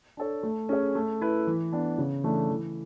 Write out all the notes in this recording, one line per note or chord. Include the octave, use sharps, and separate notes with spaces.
D4 A4 C#5
A3
C#4 G#4 C#5
A3
E4 B4
E3
B3 D4
C#3
E3 A3 D4
E3